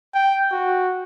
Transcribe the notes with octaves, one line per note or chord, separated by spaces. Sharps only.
G5
F#4